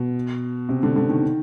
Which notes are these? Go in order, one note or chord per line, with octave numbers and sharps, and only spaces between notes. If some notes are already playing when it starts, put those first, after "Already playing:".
Already playing: B2
C3
D3
D3
D#3